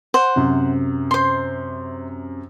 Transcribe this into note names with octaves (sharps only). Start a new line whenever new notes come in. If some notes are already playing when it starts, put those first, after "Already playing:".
C5 F#5
F#2 C3
C5 C6